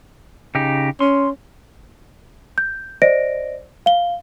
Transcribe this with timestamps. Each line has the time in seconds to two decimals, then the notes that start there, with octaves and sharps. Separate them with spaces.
0.55 C#3 D#4 G4
1.00 C#4 C6
2.58 G6
3.02 C5 D5 D#5 A#6 D7
3.86 F5 G7